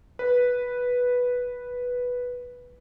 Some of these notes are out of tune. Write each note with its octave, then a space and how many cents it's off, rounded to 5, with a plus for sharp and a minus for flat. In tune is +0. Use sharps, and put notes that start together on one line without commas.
B4 -5